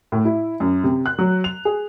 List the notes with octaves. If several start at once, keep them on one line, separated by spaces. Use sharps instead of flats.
A2
E4
F#2
C3
F#6
F#3
F7
G#4